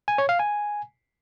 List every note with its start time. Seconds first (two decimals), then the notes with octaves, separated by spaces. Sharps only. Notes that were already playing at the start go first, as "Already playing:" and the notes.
0.08 G#5
0.18 C#5
0.29 F5
0.39 G#5